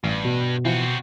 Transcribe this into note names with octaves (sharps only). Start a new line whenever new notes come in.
A1 G2
B2
E3 F3 C4 F#4